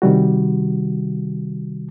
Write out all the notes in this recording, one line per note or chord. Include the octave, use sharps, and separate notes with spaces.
C3 D#3 G3 F#4